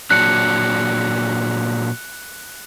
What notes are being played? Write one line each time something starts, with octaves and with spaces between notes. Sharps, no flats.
A#2 F#3 D4 F#6 C#7